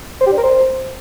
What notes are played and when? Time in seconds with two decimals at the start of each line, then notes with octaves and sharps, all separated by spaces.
0.21 C5
0.26 G4
0.32 D4
0.38 A#4
0.43 C5